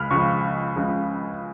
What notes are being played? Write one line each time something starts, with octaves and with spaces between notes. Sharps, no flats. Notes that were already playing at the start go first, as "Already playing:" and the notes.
Already playing: C#2 C#3 G#3 B5 F6
C#2 C#3 F3 G#3 C#6
C#2 C#3 F3 G#3